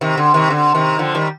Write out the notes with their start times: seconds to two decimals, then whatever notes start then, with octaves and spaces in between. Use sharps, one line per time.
0.01 C3 D#3
0.17 D3
0.34 C3 D#3
0.50 D3
0.75 C3 D#3
0.99 D3 F3
1.15 D#3 G3